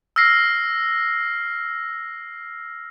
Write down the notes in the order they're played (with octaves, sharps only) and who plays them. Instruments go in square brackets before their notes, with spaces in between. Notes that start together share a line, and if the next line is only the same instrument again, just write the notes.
[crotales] E6 F6 A#6 C7